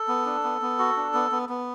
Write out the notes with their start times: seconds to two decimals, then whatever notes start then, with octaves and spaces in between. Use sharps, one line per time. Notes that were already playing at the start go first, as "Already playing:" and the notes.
Already playing: A4
0.08 B3
0.26 D4
0.44 B3
0.62 B3
0.79 F#4
0.97 D4
1.14 B3
1.32 B3
1.49 B3